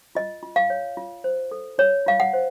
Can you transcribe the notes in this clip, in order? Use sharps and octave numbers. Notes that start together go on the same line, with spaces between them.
F4 D#5
F4
F5
C#5
F4
C5
A4
F4 C#5
F4 F5
F#5
C5